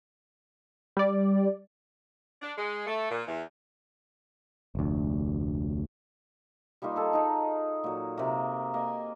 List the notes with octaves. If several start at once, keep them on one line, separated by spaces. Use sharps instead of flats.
G3 D5
D4
G#3
A3
A#2
E2
F1 D2
G3 A#3 D#4 F4
G#4 A4
D#4 G#4
A#2 F#3
C3 A#3
A#3 D#5 G#5